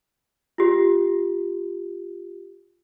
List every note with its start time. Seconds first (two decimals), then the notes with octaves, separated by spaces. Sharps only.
0.58 F4 G4